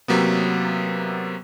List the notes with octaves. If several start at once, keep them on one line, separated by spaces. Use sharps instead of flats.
C3 F#3 A#3 B3